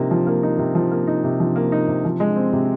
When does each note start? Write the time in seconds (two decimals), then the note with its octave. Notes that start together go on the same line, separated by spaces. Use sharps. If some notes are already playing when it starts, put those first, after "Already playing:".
Already playing: C3 F3 A#3 D#4
0.11 F3
0.27 A#3
0.43 D#4
0.59 C3
0.75 F3
0.91 A#3
1.07 D#4
1.24 C3
1.40 F3
1.56 A#3
1.72 D#4
1.88 C3
2.05 F3
2.20 G#3
2.36 C4
2.53 C3